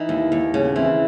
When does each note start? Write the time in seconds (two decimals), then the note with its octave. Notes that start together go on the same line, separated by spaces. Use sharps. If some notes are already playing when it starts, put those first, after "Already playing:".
Already playing: E3 D#4
0.09 D#2
0.32 D#2
0.54 C#3
0.65 B3
0.75 E3 C4